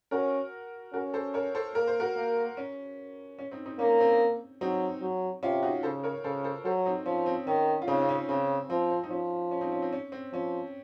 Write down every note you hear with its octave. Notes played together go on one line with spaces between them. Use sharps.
C#4 F#4 A#4
C#4 F#4 A#4
A4 C5
A#4 C#5
A4 C5
A#3 A#4
C5
F#4 A#4
A#3
C#4
C#4
C4 D#4
C4 D#4
A#3 C#4
C4
F#3 C4 D#4
F#3
C3 C#4 F4
D#4 F#4
C#3 A4 C5
A#4 C#5
C#3 A4 C5
A4 C5
F#3 A4 C5
C4 D#4
F3 C#4
C4
D#3 C#4
F4
C#3 C4 D#4
C4
C#4
C#3 C4
F3 C4
C4
D#4
F3 C#4
C#4
C4 D#4
C#4
C4
C#4
C4
F3 C#4